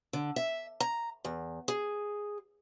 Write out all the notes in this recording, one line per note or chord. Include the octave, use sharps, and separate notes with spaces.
D3
E5
A#5
E2
G#4